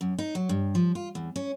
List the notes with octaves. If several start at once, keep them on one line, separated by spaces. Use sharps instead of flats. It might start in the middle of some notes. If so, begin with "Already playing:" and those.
F#2
D#4
F#3
G2
F3
F4
E2
C#4